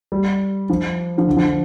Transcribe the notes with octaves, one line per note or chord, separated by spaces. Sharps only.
G3
F3
F3
D3
F3